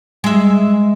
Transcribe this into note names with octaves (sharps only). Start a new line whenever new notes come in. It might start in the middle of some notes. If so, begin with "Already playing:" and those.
G#3 E5